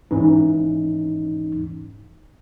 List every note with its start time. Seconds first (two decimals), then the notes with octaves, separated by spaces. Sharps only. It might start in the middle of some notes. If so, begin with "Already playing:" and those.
0.11 G#2 E3 C#4 D#4